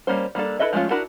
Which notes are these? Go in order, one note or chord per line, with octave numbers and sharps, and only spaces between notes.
G3 A#3 C#4 C5
G3 A#3 D4 A4
E4 A4 B4 D#5 E5
F3 G#3 A3 C#4 F4
D4 E4 F#4 A#4